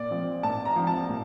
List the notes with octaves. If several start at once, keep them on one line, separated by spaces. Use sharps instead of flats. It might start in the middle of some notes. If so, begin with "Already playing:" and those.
Already playing: A#2 D5
F3 C4
A#2 A5
A#5
F3 C4
A5
A#2